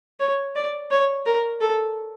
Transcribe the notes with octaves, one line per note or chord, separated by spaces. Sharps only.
C#5
D5
C#5
A#4
A4